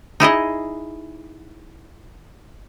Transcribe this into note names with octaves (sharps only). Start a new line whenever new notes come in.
D#4 E4 G#4 D#5